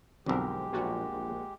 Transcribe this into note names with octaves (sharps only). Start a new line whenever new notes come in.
B1 F2 D3 G#3 C4 G4 A#4
A#1 A#3 F4 F#4
A#1